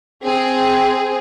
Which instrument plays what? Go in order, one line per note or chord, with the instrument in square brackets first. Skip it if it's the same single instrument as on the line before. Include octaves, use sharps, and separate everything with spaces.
[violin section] C4 G#4